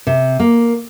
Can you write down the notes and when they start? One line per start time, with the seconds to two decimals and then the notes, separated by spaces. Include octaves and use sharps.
0.07 C3
0.40 A#3